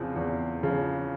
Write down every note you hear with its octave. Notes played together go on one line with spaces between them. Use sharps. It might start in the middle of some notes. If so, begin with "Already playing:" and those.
Already playing: E2 C#3 F3 C4
E2
C#3 F3